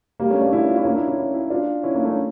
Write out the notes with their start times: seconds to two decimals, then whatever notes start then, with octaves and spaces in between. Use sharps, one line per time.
0.20 G3 A#3
0.30 A3 C#4
0.41 A#3 D4
0.53 C#4 E4
0.68 D4 F4
0.77 C#4 E4
0.85 A#3 D4
0.96 C#4 E4
1.07 C#4 E4
1.18 C#4 E4
1.34 C#4 E4
1.50 D4 F4
1.83 C#4 E4
1.95 A#3 D4
2.05 A3 C#4